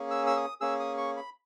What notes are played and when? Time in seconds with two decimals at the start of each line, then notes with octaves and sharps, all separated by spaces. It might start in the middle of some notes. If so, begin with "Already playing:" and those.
Already playing: A#3 C#4 G#4
0.11 E6
0.27 E6
0.36 D#6
0.61 A#3 C#4 G#4 E6
0.80 D#6
0.98 C#6
1.17 B5